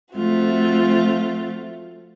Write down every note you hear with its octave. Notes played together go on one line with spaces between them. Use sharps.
F3 A3 C4 F4 F#4